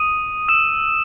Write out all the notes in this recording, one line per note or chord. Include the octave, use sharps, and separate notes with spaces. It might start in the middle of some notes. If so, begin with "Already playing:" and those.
Already playing: D#6 D#7
E6 E7